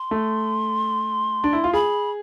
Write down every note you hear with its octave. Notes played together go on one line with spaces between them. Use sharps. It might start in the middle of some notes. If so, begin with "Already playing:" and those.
Already playing: C6
A3
D4
E4
F4
G#4 B5